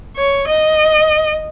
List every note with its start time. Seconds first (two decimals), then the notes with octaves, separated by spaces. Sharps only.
0.17 C#5
0.47 D#5